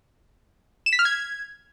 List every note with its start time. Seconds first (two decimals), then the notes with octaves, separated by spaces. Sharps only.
0.86 E7
0.93 B6
0.99 F6
1.05 G#6